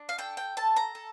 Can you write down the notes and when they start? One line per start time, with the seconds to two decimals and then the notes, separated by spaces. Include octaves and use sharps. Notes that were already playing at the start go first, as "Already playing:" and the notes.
Already playing: D4
0.09 F5
0.18 A4 G5
0.37 G5
0.57 A4 A5
0.76 A#5
0.95 A4